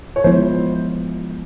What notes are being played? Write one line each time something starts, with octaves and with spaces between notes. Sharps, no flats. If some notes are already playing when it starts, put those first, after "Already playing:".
C#5
F3 G#3 B3 E4 C5